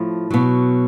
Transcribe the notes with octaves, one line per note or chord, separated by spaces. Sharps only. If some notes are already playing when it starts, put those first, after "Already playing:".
Already playing: A2 F3
B2 F#3